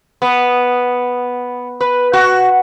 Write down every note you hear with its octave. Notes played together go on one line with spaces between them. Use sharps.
B3
B4
F#4